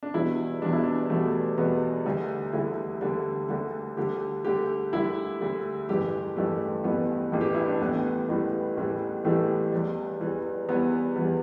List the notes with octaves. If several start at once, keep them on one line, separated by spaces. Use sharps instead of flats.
D4
E2 B2 G3 E4
E2 B2 G3 D4
E4
D4
E2 B2 G3 A3
E2 B2 G3 B3
D2 D3 G3
D2 D3 G3 E4
D2 D3 G3
D2 D3 G3
D2 D3 G3 G4
D2 D3 G3 G4
D2 D3 G3 E4
D2 D3 G3
A1 G2 E3 G3 G4
A1 G2 E3 G3 A3
A1 G2 E3 G3 B3
A1 G2 E3 G3
G4
E4
D4
A1 A2 E3 G3 B3
A1 A2 E3 G3
A1 A2 E3 G3
A1 A2 E3 G3 A3
E2 E3 G3
E2 E3 G3
E2 E3 G3 B3
E2 E3 G3